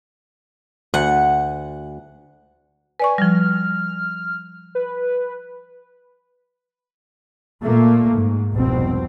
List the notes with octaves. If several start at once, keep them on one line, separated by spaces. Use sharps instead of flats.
D2 F#5
B4 D5 G#5 C#6
F3 G3 F6
B4
A#2 A3 A#3
G#2
F1 C2 B2 C4